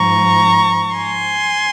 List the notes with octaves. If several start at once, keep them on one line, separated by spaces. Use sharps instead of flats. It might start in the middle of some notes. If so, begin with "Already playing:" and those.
Already playing: G#2 F3 A#5 C#6
G#5 C6